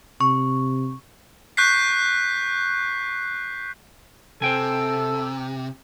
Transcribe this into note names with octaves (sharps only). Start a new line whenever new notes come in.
C3 C#6
C#6 F#6 G6 B6 C7
C3 A4 C5 G5 G#5 E6